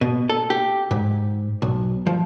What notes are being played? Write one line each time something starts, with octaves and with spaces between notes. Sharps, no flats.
B2
A4
G4
G#2
B1
F3